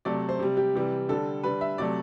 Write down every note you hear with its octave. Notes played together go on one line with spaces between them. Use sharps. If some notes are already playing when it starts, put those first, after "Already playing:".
C3 F#3 A3 D5
C5
C3 G3
G4
C3 E3 G3
D3 G3 A4
D3 G3 B4
E5
C3 F#3 A3 D5